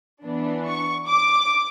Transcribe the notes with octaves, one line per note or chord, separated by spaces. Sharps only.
E3 B3 D4
C#6
D6